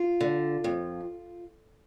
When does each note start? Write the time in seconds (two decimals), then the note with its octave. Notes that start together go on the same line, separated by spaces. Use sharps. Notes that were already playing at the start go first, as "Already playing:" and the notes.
Already playing: F4
0.21 D3
0.64 F2